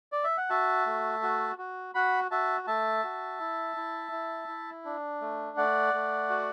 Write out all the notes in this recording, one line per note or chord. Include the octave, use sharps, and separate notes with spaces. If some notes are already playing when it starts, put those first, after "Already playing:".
D5
E5
F#5
F#4 E5 A5
A3
F#4
F#4
F#4 F#5 B5
F#4 E5 A5
A3 E5 A5
F#4
E4
E4
E4
E4
D4
A3
A3 D5 F#5
A3
F#4